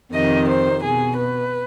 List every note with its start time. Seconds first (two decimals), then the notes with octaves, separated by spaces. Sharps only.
0.13 F2 C3 D#3 D#5
0.48 C5
0.81 B2 G#4
1.15 B4